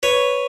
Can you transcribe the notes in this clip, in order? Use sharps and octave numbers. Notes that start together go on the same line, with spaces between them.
B4 C#5